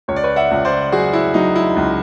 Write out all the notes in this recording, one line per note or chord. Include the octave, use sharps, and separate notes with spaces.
C#2 C#5
D5
B4 C#5
E5 F#5
C#2
C5 D5
F#3 F#4 G#4
E4
F#3 D#4
E4
C#2